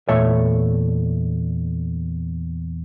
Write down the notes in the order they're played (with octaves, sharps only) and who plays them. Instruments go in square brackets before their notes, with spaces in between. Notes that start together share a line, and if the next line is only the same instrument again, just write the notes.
[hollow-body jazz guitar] E2 A#2 A3 A4 C#5 E5